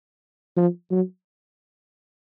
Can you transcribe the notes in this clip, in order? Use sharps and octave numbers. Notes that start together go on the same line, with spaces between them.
F3
F#3